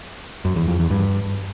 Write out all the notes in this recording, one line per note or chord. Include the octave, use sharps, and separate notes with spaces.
F#2
E2
F2
E2
G2